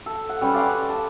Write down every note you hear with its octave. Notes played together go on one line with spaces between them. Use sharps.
A4
F#5
G3 C#4 B4
D5 F5 F#5 C6
A5